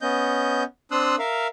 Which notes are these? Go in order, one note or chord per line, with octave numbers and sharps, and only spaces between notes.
B3 C#4 D#5 G6
C4 D4 C6 D#6 E6 F#6
A#4 E5 F5